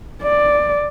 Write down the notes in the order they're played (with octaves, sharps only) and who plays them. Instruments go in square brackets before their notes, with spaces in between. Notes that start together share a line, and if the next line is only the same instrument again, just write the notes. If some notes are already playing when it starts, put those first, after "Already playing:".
[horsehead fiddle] D5